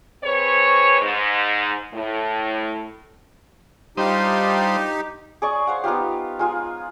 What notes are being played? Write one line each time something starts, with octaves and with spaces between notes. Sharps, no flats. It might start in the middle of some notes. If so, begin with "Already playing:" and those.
C4 G#4 B4 C#5
G#2
A2
G3 D4 D#4 F4 G4 C5 D#6
G#4 D5 C#6 D#6
C5 F5 F#5
B3 D#4 F4 G4
G#3 F4 G#5